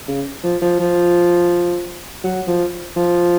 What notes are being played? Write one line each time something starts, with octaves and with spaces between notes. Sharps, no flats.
C#3
F3
F3
F3
F#3
F3
F3